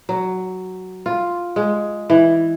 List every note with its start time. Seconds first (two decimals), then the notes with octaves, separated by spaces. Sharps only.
0.09 F#3
1.06 F4
1.56 G#3
2.10 E3